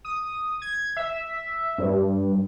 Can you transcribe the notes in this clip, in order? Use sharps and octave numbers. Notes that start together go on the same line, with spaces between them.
D#6
G#6
E5
G2